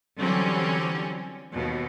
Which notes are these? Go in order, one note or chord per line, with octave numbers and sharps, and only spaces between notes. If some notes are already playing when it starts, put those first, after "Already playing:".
D3 E3 F#3 G3 C4 C#4
D#2 B2